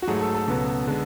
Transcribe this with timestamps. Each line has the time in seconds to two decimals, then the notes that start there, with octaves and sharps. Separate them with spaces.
0.02 F#4
0.08 G#2 F#3 A3 G#4
0.21 A4
0.35 A4
0.48 C#2 B2 F#3 B3
0.87 D3 G#3 B3